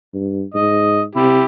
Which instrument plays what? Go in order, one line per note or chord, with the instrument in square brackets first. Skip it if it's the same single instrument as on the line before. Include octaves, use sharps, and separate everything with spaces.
[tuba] G2
[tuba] G#2 [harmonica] D#5
[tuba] C3 [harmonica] E4 G4